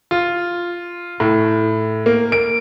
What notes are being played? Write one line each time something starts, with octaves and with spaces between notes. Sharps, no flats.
F4
A2
A#3
D7